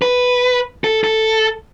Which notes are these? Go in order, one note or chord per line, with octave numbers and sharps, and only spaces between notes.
B4
A4
A4